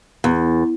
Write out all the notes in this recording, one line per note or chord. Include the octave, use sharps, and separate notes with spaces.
E2